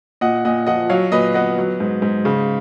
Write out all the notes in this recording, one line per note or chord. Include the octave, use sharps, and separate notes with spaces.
A#2 D#5 F#5
A#2 D#5 F#5
F3 D#5 F#5
F#3 C#5 F5
A#2 B4 D#5
B3 D#5 F#5
F#3
G#2
G#2
C#3